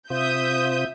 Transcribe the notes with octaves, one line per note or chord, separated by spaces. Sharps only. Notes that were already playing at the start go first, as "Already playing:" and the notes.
C3 F4 C5 E5 D#6 G6